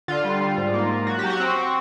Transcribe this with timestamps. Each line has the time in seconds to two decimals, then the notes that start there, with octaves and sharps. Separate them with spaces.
0.08 D3 F4
0.24 G3
0.41 G3
0.57 G#2
0.74 A#3
0.91 A#3
1.07 F#3 F#4
1.19 F#3 G4
1.30 F#4
1.40 C4
1.56 C4